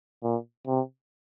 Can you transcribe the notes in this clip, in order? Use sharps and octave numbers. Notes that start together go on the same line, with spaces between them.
A#2
C3